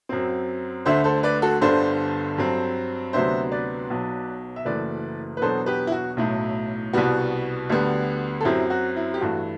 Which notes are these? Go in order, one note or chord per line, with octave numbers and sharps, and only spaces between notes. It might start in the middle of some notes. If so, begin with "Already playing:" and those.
F#2 F#3 C4
D2 D3 A3 D4 C5 E5
A4 C5
B4 D5
F#4 A4
G1 G2 D3 G3 D4 A4 C5
G2 F#3 C4
D2 C3 F#3 B3 D4 C5 E5
B4 D5
B1 B2 F#3
E5
F#1 F#2 E3 A3 B4 D5
B4
E2 B2 F#3 B3 D4 A4 C5
G4 B4
E4
F#4
B1 A2 F#3 E4
C2 B2 G3 B3 F#4
D2 D3 G3 B3
A4
F#2 F#3 C4 E4 G4
F#4
E4
G4
G2 E3 A3 F#4